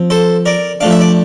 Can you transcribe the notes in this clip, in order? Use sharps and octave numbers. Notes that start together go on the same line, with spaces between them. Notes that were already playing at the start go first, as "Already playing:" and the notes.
Already playing: F3 C4
A4 C5
A#4 D5
F3 A3 D4 F5
E5
D5